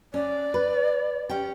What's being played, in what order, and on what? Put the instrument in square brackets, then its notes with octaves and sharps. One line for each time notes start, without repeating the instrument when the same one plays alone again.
[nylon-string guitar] C#4 [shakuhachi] D5
[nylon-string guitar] B4
C#4 G4 G5